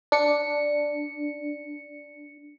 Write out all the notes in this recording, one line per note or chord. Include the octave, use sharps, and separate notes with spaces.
D4 C#7